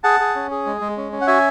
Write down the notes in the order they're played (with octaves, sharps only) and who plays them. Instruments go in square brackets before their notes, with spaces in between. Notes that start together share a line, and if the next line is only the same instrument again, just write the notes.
[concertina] G#4 F#5 A5
G#4
C#4
G#4
G#3
G#3
C#4
C#4
F#5
F#4 E5 G#5